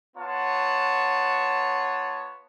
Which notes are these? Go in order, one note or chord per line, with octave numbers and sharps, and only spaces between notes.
B3 F4 C#5 F#5 A5